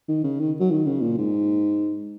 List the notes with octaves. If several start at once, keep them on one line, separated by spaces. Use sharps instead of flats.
D#3
C#3
D#3
F#3
D#3
C#3
A#2
G#2